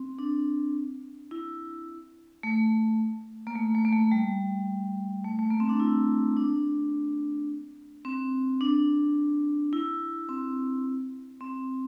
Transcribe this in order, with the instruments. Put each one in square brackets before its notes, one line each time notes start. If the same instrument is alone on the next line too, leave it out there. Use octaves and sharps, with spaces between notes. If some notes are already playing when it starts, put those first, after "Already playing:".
Already playing: [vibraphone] C4
D4
E4
A3
A#3
A3
A3
A#3
A3
G3
A3
A3
A#3
C4
D4
E4
D4
C4
D4
E4
C4
C4